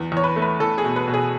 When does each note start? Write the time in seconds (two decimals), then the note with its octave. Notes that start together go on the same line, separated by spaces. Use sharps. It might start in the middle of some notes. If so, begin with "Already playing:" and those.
Already playing: E2
0.12 E2 C#5
0.24 B4
0.36 A3
0.42 B4
0.60 E2 A4
0.78 G#4
0.84 B2
0.96 B4
1.08 B2
1.14 G#4